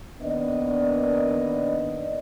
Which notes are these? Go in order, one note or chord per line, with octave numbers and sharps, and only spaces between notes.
D#3 A#3 B3 D4 D5 D#5